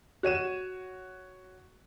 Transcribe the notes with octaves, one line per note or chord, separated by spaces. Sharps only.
F#4 C#5 D#7 E7